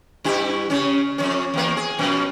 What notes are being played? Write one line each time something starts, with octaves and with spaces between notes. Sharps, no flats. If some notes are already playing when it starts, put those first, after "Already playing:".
G2 E4 G4
C#3 C#4
F2 C#4
E2 A#3
G#4
F#2 B2 F3